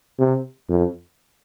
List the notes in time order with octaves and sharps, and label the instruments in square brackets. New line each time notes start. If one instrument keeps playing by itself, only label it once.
[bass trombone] C3
F2